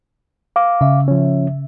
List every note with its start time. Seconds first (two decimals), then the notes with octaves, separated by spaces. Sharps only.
0.56 F5 D6
0.81 C#3 E5
1.08 F3 C#4